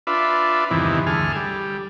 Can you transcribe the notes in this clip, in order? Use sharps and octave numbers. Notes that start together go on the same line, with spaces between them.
D4 F4 B4 E5
E2 G2 C3 D#3 E3
D2 G#4 A4 F6
G3